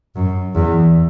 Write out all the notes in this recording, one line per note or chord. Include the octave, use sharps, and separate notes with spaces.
F#2
E2